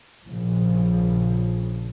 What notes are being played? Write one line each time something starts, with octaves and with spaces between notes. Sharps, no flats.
A#1 G#2 C#3 F3